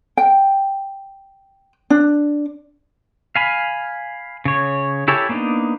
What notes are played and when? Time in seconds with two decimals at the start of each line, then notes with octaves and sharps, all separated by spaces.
0.17 G5
1.90 D4
3.36 F5 G#5 B5
4.45 C#3 C#5
5.08 E4 G4 A4 C#5 G#5
5.29 A#3 B3 D4 D#4